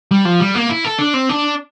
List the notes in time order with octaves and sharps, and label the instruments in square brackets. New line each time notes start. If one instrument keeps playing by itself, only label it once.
[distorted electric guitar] G3
F3
G3
A#3
E4
A4
D4
C4
D4